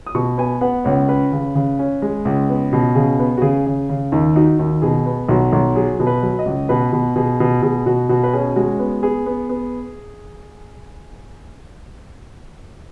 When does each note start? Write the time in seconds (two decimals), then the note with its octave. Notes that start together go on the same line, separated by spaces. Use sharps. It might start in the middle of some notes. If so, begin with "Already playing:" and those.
0.06 D#6
0.15 B2 C#6
0.38 B3 G#5
0.61 B3 F#5
0.84 C#2 C#5
1.09 C#4 B4
1.32 C#3
1.55 C#3
1.79 C#4
2.02 G#3
2.25 C#2
2.49 B3
2.73 B2
2.95 C#3 G#4
3.19 B3
3.37 F#4
3.42 C#3 G#4
3.66 C#3
3.89 C#3
4.12 D#2
4.36 D#4 F#4
4.59 D#2
4.82 B2 G#4
5.06 B3
5.29 B1 F#4
5.53 B1
5.76 F#3 G#4
6.00 B2
6.07 B4
6.22 F#3
6.39 D#5
6.46 C#2
6.69 B2 B4
6.93 B2
7.16 B2 G#4
7.40 B2
7.62 B2 G#4
7.86 B2 F#4
8.09 B2 F#4
8.24 B4
8.33 C#4 G#4
8.56 G#3 F#4
8.79 B3
9.03 B3 G#4
9.26 B3
9.49 B3